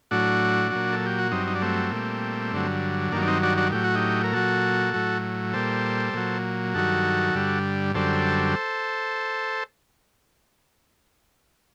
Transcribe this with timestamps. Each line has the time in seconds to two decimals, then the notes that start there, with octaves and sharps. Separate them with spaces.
0.11 A2 F#3 D4 F#4
0.71 A#2 F#3
0.93 A4
1.06 G4
1.19 F#4
1.31 G2 F#3 C4 D#4
1.47 D#4
1.55 D4
1.62 A3 C4
1.91 A#2 G3
2.53 G2 D3 F#3
3.12 G2 D#3 F#3 A#3 D4
3.22 D4
3.27 C4 D#4
3.43 D4 F#4
3.57 D4 F#4
3.72 A2 F#3 G4
3.84 F#4
3.95 D#4 G4
4.24 A#4
4.33 A#2 F#3 F#4 A4
4.94 A2 F#3
5.53 A#2 G3 A4 C5
6.14 A#2 F#3
6.74 G2 D#3 F#3 F#4 A4
7.34 G2 D3 G3
7.94 F#2 D3 G3 A4 C5